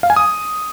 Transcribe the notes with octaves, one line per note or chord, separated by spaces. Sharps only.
F5
G#5
D#6